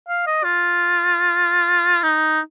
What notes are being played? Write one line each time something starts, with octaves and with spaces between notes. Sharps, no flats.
F5
D#5
F4
D#4